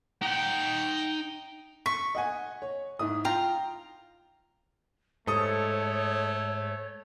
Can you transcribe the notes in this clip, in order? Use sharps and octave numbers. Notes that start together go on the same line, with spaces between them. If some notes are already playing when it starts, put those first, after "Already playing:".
D#4 F#5 G5
C#6 B6
D#5 F#5 G#5
C#5
G#2 E4 D#6
F4 G5 A#5
G#2 A3 A4 C#5 D#6